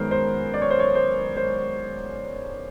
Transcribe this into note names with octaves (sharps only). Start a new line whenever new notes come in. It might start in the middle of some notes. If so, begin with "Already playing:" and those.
Already playing: F#2 D#3 G#3 B3 A#4 C5
C5
D5
C#5
C5
C#5
C5
C5